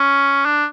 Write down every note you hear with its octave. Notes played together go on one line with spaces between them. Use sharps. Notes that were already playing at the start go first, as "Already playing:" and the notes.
Already playing: C#4
D4